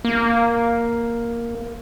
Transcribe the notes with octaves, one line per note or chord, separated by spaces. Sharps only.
A#3